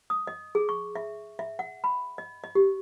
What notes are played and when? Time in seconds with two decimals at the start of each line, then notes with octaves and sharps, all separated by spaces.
0.10 D#6
0.27 D#5
0.55 G#4
0.69 C#6
0.96 E5
1.39 E5
1.59 F#5
1.84 B5
2.18 D#5
2.44 D#5
2.55 G4